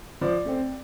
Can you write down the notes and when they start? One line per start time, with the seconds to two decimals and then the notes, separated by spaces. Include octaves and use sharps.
0.21 F3 D5
0.46 A3 C4